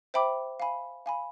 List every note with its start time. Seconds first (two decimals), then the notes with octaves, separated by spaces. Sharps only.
0.14 C5 E5 G5 B5 D6
0.60 F5 G#5 B5
1.06 F5 G#5 B5